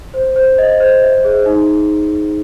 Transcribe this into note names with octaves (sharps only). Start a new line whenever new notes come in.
C5
C5
D#5
C5
E5
G#4
D#4